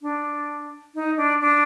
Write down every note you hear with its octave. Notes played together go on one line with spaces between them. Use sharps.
D4
D#4
D4
D4